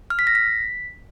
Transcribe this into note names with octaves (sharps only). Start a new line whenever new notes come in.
F6
B6
A#6
B6